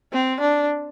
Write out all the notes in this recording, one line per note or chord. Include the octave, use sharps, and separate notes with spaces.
C4
D4